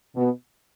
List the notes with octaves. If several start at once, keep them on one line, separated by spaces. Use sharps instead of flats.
B2